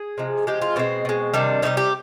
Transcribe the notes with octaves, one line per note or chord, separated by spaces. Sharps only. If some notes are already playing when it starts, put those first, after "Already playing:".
Already playing: G#4
C3 F3 G#3
C3 F3 G#3 G4
F4
B2 G#3 C4
B2 G#3
C3 D#3 G3 D4
C3 D#3 G3 D#4
G4